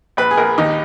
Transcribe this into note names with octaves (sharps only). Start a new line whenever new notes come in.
A#1 B4
G#4
A#1 A#4
D#2 D#4